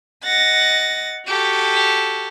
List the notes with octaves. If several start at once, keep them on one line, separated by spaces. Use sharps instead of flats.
D#5 F#5 A6 A#6
F#4 G4 A4